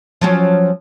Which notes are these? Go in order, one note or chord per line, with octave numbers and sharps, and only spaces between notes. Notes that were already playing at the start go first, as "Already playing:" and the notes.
F3 F#3 C#4